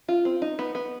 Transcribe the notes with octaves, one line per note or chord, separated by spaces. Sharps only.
F4
C4
D#4
B3
B3